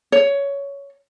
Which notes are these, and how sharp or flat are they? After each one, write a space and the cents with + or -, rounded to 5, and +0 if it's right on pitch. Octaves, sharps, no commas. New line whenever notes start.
C#5 +15